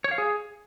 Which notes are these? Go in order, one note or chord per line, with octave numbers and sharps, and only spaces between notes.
C#5
F5
G#4